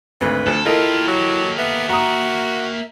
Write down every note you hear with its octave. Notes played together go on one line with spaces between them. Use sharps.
G#1 D2 B4
D2 F3 A4
A#3 E4 F4 G4 A4 A#4 D#5
F#3
B3 E5
F#4 A#5 D#6